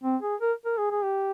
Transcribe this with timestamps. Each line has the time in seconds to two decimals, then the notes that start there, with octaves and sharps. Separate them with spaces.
0.04 C4
0.22 G#4
0.41 A#4
0.65 A#4
0.78 G#4
0.91 G#4
1.03 G4